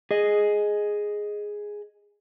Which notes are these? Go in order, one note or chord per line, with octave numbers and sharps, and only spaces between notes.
G#4 D#5